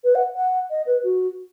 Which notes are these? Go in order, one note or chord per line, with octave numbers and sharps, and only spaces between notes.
B4
F#5
F#5
D#5
B4
F#4